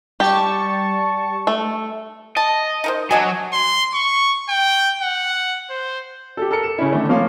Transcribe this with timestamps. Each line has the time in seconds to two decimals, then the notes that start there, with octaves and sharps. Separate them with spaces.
0.20 G3 G4 A5 C#6
1.47 A3
2.37 D#5 A5
2.84 D#4 A#4 C5
3.11 F#3 D4 D#5 G#5
3.53 C6
3.94 C#6
4.49 G5
5.02 F#5
5.70 C5
6.37 G4 A4
6.51 A4 A#4 C#7
6.63 E7
6.78 C#3 C#4 E4
6.93 D3 D#3 A3
7.09 F3 A3 A#3 F4 C#5 F5